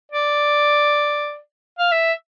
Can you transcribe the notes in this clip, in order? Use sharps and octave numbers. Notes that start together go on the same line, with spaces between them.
D5
F5
E5